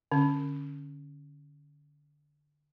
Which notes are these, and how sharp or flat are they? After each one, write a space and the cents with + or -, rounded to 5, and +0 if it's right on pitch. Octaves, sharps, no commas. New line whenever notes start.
D3 +0 C#4 +0